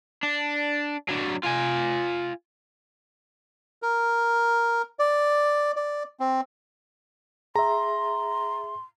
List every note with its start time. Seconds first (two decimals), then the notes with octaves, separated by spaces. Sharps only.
0.23 D4
1.09 F#3 D4
1.45 F4 G#5
3.82 A#4
4.99 D5
5.76 D5
6.20 C4
7.56 G#4 E5 A#5 C6